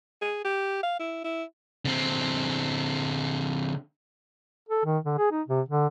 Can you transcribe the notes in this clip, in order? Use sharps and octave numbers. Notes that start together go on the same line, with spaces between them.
G#4
G4
F5
E4
E4
D3 C4
A4
D#3
D3
G#4
D#4
C3
D3